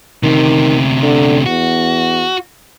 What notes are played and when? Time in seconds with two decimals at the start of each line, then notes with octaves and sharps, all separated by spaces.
0.23 D2 C3 D#3
1.02 D3
1.46 E2 F#4